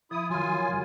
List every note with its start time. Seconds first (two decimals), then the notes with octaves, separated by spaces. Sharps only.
0.11 F3 E4 D#6
0.30 D#3 F#3 F4 G#5
0.68 C#3 F#3 G3